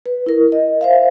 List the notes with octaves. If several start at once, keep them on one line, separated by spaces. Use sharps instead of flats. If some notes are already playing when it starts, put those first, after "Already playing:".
B4
E4 A#4
D#5
C5 E5 F5